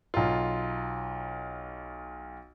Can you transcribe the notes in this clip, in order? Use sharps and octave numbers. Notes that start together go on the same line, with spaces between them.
B1 F4